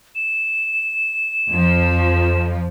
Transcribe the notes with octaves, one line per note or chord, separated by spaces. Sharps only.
E7
F2 F3